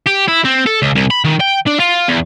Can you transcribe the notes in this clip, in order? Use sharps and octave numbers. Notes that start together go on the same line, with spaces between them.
G4
E4
C4
A4
C#2
C2
B5
D#3
G5
D4
F4
E2